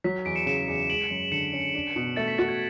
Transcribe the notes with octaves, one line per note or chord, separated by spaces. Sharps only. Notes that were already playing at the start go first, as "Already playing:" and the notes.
F#3 B6
E2 B6 D7
C#7 E7
C#3 C#7 E7
E2
G#3 D7 F#7
F#2
D3 C#7 E7
C#4
D4
B2
A3 A6 C#7
B6
F#4 A6
G#6